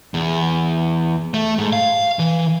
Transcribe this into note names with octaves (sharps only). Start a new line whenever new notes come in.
E2
A3
G#2
F5
E3